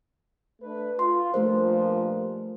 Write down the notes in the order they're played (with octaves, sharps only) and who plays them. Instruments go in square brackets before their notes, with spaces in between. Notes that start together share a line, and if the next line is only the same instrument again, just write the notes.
[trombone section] A3 D4 B4
[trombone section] F4 [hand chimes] C6
[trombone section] G2 A#2 F3 [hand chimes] A3 A#4 C5